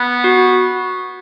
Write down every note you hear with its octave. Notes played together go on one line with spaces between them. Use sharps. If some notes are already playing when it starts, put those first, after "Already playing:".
Already playing: B3
F#4